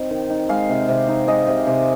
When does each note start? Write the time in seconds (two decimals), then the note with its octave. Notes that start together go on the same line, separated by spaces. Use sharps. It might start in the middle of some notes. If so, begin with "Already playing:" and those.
Already playing: C4 D#4
0.11 D#3
0.30 D#4
0.49 G#3 F5
0.69 C3
0.89 C3
1.08 D#4
1.28 G#3 D#5
1.48 C3
1.67 C3